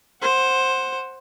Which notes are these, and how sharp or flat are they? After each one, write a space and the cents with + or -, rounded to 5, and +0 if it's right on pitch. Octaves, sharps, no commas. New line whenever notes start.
C5 +10 F#5 +0